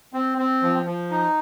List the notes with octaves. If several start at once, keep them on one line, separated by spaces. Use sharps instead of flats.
C4
C4
F3
F3
D#4